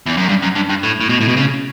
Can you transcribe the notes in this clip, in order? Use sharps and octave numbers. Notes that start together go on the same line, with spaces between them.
E2
F#2
G2
F#2
G2
G2
A2
A2
B2
A2
B2
C#3